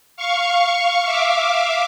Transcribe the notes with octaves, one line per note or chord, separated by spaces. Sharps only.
F5 C#6
E5 F5 D6